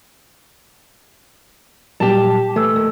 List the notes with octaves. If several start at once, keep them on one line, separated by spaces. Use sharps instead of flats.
A#2 F#3 G3 G4 A5
E3 A3 A4 E6
D#2